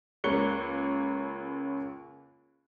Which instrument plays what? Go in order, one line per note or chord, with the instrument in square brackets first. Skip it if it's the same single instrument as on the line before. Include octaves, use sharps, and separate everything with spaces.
[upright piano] C#2 A#3 C#5 F#6 C#7 G7